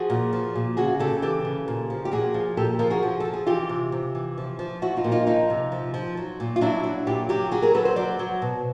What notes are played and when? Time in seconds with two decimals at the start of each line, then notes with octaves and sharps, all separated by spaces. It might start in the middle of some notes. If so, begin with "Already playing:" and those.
Already playing: F3 F#4 G#4
0.10 A#2
0.33 F3
0.55 A#2
0.77 C#3 F#4 G#4
0.99 C#3 G4 A4
1.22 E3 G4 A4
1.45 C#3
1.68 A#2
1.90 F3
2.05 G4
2.12 A#2 F#4 G#4
2.34 F3
2.57 A#2 G4 A4
2.79 F3 G#4 A#4
2.90 F#4 G#4
3.03 F3
3.20 F3 A4
3.33 G#4
3.47 E3 F4 G4
3.69 C3
3.92 C3
4.15 E3
4.38 F3
4.59 F3
4.82 F3 E4 F#4
4.96 D#4 F4
5.04 A#2
5.12 D#4 F4
5.27 F3 D#4 F4
5.50 C3
5.72 F3
5.94 F3
6.17 F#3
6.40 A#2
6.56 F4
6.61 F#3 D4 E4
6.84 F#3
7.07 A#2 F4 G4
7.29 F#3 F4 G4
7.51 F#3 F#4 G#4
7.62 G#4 A#4
7.74 F#3 A4 B4
7.85 A#4 C5
7.96 F#3 C5 D5
8.19 F#3
8.42 B2